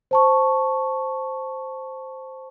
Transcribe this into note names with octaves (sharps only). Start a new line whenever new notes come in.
C5 A5 C#6